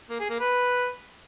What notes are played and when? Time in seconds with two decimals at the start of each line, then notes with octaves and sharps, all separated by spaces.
0.10 A#3
0.20 G#4
0.30 A#3
0.40 B4